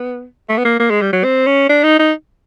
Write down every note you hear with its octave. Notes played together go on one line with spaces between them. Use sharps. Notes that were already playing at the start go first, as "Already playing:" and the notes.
Already playing: B3
A3
B3
A#3
A#3
G#3
G3
F#3
C4
C#4
D4
D#4
D#4